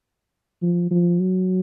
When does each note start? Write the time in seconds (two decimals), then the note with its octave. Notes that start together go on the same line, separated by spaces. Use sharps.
0.62 F3
0.91 F3
1.20 F#3